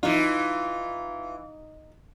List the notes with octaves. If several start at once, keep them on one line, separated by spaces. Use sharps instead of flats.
E3 D#4 F4